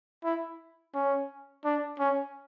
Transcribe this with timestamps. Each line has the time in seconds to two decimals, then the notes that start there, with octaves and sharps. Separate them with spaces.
0.24 E4
0.94 C#4
1.64 D4
1.99 C#4